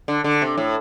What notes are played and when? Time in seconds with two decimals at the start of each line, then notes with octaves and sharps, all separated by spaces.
0.08 D3
0.24 D3
0.42 C3
0.58 A2